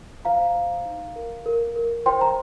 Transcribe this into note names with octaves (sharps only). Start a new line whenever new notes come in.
C5 F5 A#5
C5
D#4
A#4
A#4
A#4
C5 G5 C6
A#5